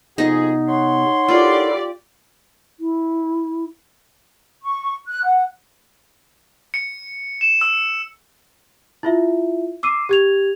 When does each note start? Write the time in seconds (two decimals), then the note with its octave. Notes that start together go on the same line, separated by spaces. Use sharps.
0.18 F2 C3 B3 D#4 G#4
0.68 C#5 F#5 C6
1.28 E4 F4 G4 A4 A#4 D5
2.80 E4
4.63 C#6
5.08 F#6
5.24 F#5
6.74 C#7
7.41 E7
7.61 E6
9.03 E4 F4 E5
9.83 D6 E6 C7 D#7
10.09 G4 G#6 F7